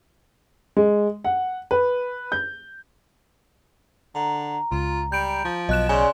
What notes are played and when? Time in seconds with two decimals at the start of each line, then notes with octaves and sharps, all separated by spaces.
0.77 G#3
1.24 F#5
1.71 B4
2.32 G6
4.15 D3 A#5
4.72 C#2 F4
5.12 G3 G6 D7
5.45 F3
5.69 B1 B2 F#3 D#5 F#6 E7
5.89 C#3 D5 G#5 C6